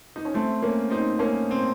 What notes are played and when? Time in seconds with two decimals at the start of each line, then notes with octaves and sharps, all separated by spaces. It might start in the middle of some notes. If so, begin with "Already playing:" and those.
0.16 D#4
0.25 C#4
0.34 A3 C4
0.62 A#3 C#4
0.90 C4 D#4
1.19 A#3 C#4
1.51 C4